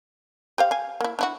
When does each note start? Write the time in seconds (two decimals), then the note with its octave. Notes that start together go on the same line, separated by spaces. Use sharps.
0.58 G4 C5 F5
0.71 F5 G#5
1.01 A#3 E4
1.19 D4 E4 F#4